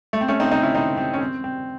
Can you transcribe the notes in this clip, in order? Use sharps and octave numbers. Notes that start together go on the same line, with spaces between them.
A3
C4
A3 C#4
C4 D#4
C4 D#4
C#4 E4
C4 D#4
C4
C#4
C4
C4